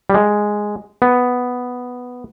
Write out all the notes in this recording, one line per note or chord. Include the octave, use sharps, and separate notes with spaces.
G3
G#3
B3